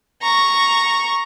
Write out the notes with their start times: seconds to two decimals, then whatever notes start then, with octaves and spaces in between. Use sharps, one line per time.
0.22 A#5 C#6